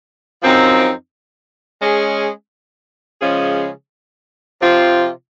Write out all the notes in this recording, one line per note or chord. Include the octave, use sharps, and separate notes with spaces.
F#2 F3 C4 D#4
G#3 C#4 G#4
C#3 F3 G#3 C#4 G#4
C3 F3 C4 F4